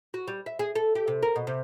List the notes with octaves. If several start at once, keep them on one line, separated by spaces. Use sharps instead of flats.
F#4
G3
E5
G#4
A4
G4
C3
A#4
B2
C3